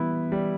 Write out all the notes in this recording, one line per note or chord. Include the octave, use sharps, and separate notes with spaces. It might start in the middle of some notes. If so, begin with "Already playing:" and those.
Already playing: E3 G3 B3 E4
G3